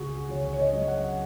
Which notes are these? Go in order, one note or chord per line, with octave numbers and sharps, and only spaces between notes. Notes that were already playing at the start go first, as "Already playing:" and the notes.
Already playing: C#2 C#3 F#4 G#4
C#2 C#5
C#5
D#5
F#3
F#5